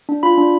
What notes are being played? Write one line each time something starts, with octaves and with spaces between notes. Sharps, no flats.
D4
F4 B5
D4